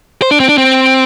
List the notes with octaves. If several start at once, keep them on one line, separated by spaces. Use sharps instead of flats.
C5
D4
C4
D4
C4